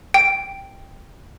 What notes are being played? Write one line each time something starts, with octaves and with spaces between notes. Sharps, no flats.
G5